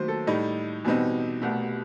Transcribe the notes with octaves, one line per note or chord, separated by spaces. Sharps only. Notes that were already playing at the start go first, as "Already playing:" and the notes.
Already playing: D#2 D#3 F#3 A3 C5
A4
A2 G3 D#4
E2 B2 G3 C4 D#4
C2 B2 A3 G4